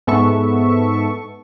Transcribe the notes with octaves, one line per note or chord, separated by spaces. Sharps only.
G#2 B3 A4 E5 C#6